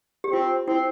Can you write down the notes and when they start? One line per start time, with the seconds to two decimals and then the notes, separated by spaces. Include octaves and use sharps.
0.24 G4
0.33 C4 F4
0.68 C4 E4